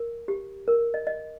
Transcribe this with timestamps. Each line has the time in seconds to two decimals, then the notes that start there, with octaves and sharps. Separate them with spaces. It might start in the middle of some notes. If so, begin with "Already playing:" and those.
Already playing: A#4
0.28 G4
0.68 A#4
0.94 D#5
1.07 D#5